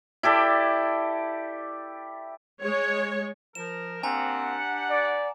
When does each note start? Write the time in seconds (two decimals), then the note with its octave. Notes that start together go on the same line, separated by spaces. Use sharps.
0.23 E4 G4 A4 D5
2.61 G#3 C#5
3.55 F3 A#4 E7
4.03 A#3 C4 D4 G4 F#5 G#5 A#5
4.90 D5